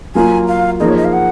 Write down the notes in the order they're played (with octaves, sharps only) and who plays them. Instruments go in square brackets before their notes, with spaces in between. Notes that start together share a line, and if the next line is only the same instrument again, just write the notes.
[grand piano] F#3 A#3 F4 [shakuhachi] G#5
[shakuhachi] F5
[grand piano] F3 A#3 D#4 G#4 [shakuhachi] D#5
[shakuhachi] C#5
D#5
F5
F#5